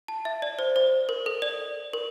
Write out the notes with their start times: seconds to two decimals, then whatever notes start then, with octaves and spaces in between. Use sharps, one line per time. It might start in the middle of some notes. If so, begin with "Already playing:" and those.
0.08 A5
0.25 E5
0.42 D5
0.59 C5
0.76 C5
1.09 A#4
1.26 A4
1.42 D5
1.93 A#4